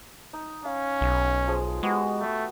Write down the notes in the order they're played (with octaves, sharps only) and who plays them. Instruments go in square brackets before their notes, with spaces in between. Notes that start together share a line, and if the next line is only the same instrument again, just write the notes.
[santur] D#4
[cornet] C#4 [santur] F5
[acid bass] B1
[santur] F3 G#3 G#4
[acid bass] G#3 [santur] B3 F#4 G4
[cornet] A3